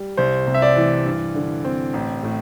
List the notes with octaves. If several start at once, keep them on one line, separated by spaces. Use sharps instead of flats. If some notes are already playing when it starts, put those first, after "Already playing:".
Already playing: G3
C2 C5
C3
E5
D5
E3
G2
D3
C4
A1
A2